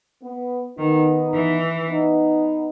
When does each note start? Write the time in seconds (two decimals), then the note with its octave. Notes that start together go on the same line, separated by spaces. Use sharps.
0.23 B3
0.78 D#3 B3 D#4
1.34 E3
1.90 B3 D#4